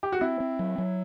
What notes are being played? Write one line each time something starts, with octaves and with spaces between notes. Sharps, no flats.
G4
F#4
C4 E4
C4
F#3
F#3